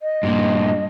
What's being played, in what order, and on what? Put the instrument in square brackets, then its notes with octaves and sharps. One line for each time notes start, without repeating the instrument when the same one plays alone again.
[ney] D#5
[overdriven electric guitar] G2 A#2